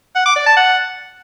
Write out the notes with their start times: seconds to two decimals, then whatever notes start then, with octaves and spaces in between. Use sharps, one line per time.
0.15 F#5
0.26 D6
0.36 D5
0.46 A5
0.57 F#5